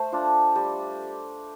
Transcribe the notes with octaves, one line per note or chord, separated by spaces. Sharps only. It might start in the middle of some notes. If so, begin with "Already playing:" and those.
Already playing: A3 C5
D4 F4
G3